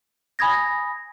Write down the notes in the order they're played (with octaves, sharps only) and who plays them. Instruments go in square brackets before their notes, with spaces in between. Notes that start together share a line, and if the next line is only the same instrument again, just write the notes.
[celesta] G#5 B5 D#6 G#6 A#6